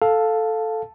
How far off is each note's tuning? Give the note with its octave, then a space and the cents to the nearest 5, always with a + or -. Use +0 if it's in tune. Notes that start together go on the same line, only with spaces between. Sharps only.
A4 +0 F5 +10 A5 +0